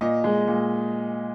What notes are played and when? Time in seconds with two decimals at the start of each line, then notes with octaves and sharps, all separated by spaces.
0.01 A#2 D#5
0.24 G#3
0.48 A#2